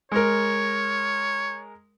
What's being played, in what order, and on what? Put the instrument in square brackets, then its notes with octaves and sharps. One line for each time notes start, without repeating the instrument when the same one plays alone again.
[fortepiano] G#3 A#4 [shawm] C#5